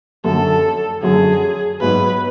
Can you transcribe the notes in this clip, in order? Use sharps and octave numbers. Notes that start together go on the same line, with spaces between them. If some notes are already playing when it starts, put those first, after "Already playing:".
F#2 D3 F#3 A4
F#2 D3 F#3 G#4
G#2 F#3 B3 B4